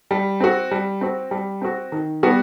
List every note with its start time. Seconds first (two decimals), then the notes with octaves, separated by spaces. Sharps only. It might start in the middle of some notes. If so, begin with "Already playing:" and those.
0.11 G3
0.40 C4 F#4
0.71 G3
1.01 C4 F#4
1.31 G3
1.62 C4 F#4
1.92 D#3
2.23 G3 B3 F#4